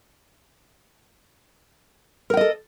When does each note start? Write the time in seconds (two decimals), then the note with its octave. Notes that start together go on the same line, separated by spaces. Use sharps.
2.30 A#4
2.34 G5
2.37 D#5
2.41 A4